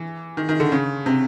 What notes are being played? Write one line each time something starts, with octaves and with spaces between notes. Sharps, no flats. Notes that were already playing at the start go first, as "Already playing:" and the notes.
Already playing: E3
D#3
D#3
D3
C#3
C3